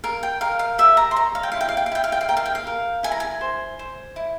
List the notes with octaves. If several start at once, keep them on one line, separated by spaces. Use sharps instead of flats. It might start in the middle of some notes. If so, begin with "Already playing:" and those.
A#4 F5
G5
A#4 F5
F5
G4 E5
A#5
C6
C#5 A#5
F5
G5
E4 F5
G5
F5
G5
F5
E4 G5
F5
G5
F5
A#4 G5
F5
G5
F5
A#4
E4 G#5
A#5
G#5
C5
C5
E4